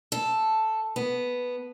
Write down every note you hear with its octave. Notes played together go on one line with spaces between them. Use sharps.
A4
B3